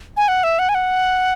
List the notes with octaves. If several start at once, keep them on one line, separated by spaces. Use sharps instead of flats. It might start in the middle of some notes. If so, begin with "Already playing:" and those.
G#5
F#5
E5
F#5
G#5
F#5